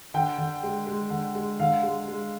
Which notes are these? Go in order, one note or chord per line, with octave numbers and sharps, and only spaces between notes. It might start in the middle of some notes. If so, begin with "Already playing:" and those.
D3 G5
D3
G#3
G#3
D3
G#3
D3 F5
G#3
G#3